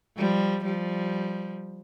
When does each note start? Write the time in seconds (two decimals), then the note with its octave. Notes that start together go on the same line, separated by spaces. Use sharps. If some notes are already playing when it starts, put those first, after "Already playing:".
0.17 F3 G3
0.64 F3 G3